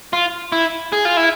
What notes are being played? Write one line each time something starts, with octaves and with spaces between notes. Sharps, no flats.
F4
E4
G#4
F4
E4